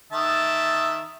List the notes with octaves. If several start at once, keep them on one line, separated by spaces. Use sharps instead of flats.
D#3 E5 A5